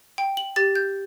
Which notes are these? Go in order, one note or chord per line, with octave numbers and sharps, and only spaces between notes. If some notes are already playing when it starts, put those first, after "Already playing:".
G5
F#7
G4 A6
G6